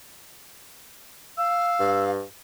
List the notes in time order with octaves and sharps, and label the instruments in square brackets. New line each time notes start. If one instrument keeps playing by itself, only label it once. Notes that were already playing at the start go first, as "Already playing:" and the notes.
[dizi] F5 [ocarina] E6
[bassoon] G2